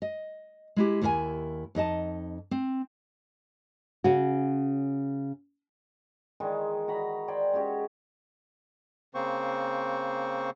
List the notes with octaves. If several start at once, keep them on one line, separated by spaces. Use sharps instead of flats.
D#5
G#3 E4 G4
D#2 E4 A#4 F5 G#5
F2 D#4 D#5 A5
C4
C#3 C#4 F#4
D#3 E3 G#3
F#4 A#5 B5
C5 D5 G5 G#5
G#3 C#4 F#4 G4
C#3 A#3 C4 C5 C#6